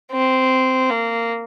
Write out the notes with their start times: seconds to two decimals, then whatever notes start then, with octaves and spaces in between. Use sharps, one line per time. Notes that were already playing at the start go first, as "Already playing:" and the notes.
0.12 C4
0.90 A#3